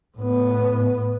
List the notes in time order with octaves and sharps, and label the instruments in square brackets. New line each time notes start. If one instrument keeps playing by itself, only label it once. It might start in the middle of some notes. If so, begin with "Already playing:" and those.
[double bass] A2 B3